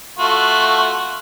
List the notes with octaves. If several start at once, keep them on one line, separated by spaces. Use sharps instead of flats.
A3 F4 F#4